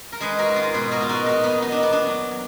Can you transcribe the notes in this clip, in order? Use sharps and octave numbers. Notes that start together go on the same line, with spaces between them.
A#4
G#3 G#4 B4
F#4 A#4
G#2
F4 G#4
B2 G#4 B4
F#4 A#4
B2 F4
D#4 F#4
A#2 D#4 F#4
B3 D#4
F#3
D#4
D4
A#3 B3
D4
F#3
F#3